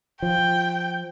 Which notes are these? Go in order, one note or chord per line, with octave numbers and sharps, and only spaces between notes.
F3 G5